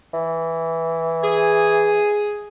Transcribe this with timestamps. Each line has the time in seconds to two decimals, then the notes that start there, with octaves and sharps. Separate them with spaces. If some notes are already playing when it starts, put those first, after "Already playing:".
0.14 E3
1.23 G#4